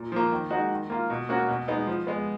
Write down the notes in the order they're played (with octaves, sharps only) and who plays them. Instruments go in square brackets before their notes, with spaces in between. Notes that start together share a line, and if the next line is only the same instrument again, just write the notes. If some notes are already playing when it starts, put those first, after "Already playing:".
Already playing: [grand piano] A#2
F3 A#3
D#3
G#3 D#4 F#4
D#3
A#3 F4
B2
A#3 C#4 F#4
B2
G#3 B3 D#4
F3
G#3 B3